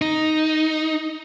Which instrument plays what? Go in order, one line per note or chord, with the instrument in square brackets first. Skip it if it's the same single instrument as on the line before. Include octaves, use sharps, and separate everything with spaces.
[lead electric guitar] D#4